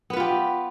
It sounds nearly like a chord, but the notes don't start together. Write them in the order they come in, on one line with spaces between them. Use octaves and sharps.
B3 B4 F4 G4